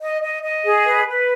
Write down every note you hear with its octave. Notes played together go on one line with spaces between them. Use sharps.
D#5
D#5
D#5
G#4
B4
B4